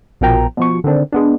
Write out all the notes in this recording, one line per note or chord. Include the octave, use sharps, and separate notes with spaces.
A#1 B2 F3 A#4 G5 A#5
B2 F3 C#6
D3 D#3 C4 D4
G#3 B3 D4